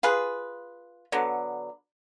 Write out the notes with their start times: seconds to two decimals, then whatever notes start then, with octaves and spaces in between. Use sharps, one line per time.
0.03 F4 G#4 B4
1.12 D3 F#3 B3